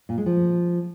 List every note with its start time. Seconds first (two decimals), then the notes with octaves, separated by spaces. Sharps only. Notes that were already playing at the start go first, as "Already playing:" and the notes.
0.09 A#2
0.18 G#3
0.26 F3